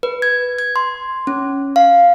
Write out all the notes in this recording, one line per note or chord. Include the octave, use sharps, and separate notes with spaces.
B4
G#6
G#6
C6
C#4
F5